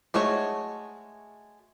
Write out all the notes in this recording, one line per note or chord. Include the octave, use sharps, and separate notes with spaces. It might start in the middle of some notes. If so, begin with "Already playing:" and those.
G#3 A3 F#4 C#5